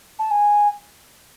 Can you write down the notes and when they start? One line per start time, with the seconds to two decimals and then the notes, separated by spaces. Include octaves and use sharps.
0.19 A5
0.31 G#5